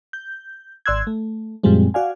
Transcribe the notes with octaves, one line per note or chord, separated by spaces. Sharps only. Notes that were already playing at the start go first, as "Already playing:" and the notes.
G6
G#1 D5 C6 E6 F#6 G#6
A3
F#2 A#2 F3 G3 G#3 C4
F#4 D5 F5 G#5